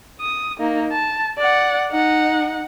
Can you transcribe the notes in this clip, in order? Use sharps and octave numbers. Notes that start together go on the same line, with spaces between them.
D#6
A#3 D#4
A5
D5 F#5
D#4 F#5